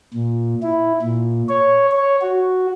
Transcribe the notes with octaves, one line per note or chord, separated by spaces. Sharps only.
A#2
E4
A#2
C#5
C#5
F#4